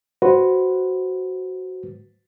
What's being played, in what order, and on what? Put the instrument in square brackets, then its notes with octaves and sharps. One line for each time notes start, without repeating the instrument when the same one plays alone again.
[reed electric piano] F#4 B4 C5